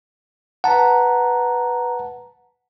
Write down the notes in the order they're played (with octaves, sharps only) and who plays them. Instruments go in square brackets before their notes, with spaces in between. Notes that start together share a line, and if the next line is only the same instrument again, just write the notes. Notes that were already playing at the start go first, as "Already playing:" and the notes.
[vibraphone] B4 A#5 [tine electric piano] F#5 A5